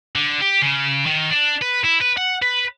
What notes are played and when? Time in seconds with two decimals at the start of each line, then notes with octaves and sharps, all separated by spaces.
0.15 D3
0.41 G4
0.62 C#3
1.06 D#3
1.31 D4
1.62 B4
1.84 E4
2.01 B4
2.17 F#5
2.42 B4